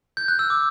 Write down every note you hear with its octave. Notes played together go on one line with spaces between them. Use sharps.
G6
F#6
E6
D6